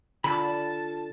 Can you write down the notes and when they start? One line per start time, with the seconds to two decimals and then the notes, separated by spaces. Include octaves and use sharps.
0.24 D3 F4 A5 B5